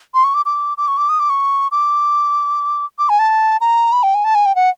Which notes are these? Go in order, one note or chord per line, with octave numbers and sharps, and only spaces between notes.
C6
C#6
D6
D6
D6
C#6
D6
D#6
D6
C#6
D6
D6
G#5
A5
A#5
B5
G5
G#5
A5
G#5
G5
F#5